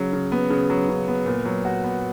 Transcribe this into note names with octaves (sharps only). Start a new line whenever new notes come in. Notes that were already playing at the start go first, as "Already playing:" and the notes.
Already playing: C#3 F#3
C#3
B3
C#3
F#3
C#3
B3
A#2
F#3
F#4
B3